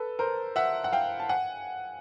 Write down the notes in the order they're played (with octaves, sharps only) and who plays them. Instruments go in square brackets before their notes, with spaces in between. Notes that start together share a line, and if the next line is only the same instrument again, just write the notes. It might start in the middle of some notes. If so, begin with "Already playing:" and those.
Already playing: [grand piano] A4 B4
A#4 C5
E5 F#5
F#5
F5 G5
A5
F#5 G#5